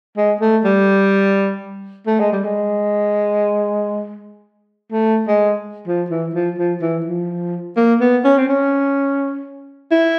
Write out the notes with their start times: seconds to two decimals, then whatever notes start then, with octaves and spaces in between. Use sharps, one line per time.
0.17 G#3
0.41 A3
0.64 G3
2.07 A3
2.20 G#3
2.32 G3
2.45 G#3
4.92 A3
5.28 G#3
5.87 F3
6.10 E3
6.34 F3
6.58 F3
6.81 E3
7.06 F3
7.77 A#3
8.01 B3
8.24 C#4
8.38 C4
8.48 C#4
9.91 E4